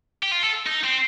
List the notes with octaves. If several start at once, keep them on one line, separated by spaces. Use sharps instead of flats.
G4
F4
A4
D#4
C4